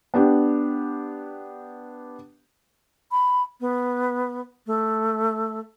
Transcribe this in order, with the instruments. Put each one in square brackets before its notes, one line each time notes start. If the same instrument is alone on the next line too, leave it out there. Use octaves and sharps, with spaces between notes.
[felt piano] B3 D4 G4
[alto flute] B5
B3
A3